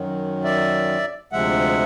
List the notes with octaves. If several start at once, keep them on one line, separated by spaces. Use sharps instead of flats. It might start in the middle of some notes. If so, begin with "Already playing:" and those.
Already playing: F#2 D#3 F#3
D5 E5
D2 C3 F3 G#3 E5 F#5